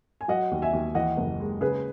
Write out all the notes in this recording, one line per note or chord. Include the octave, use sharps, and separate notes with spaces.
G#5
F#3 D#5 F#5
D#2
E5 G#5
D#2
E3 D#5 F#5
F#1
G#3
C#3 G#4 B4